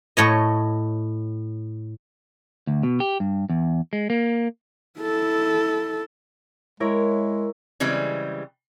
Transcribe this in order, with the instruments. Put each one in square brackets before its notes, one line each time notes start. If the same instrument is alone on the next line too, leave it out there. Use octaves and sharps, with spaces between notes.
[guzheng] A2 C#5 D#5
[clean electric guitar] D2
B2
G4
G2
E2
G#3
A#3
[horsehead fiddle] E4 A4
[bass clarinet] G#3 [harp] E4 A#4 C#5
[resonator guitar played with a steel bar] C#3 E3 G3 G#3 C4